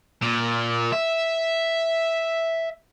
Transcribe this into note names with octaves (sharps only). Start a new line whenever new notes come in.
A#2
E5